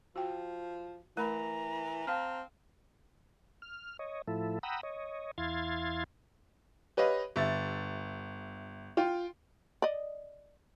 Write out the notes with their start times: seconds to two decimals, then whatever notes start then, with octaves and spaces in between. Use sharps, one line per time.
0.16 F3 F#4 G5
1.17 E3 A3 A#4 A#5 B5
2.07 C4 F5 A5 F6
3.62 F6
3.99 C#5 D#5
4.27 A2 F3 E4 A4
4.63 F#5 G5 A#5 B5 D#6 E6
4.83 C#5 D#5
5.38 E2 E4 F5 C6 G#6 A6
6.97 G4 B4 C#5 D#5 F5
7.36 G1 E5 A6
8.97 F4 G5
9.82 D5 D#5